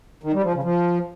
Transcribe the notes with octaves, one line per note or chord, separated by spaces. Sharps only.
D#3
G3
F3
C#3
F3